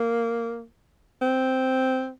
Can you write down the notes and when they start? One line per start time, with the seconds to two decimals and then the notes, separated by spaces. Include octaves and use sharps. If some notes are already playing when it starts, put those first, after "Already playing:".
Already playing: A#3
1.22 C4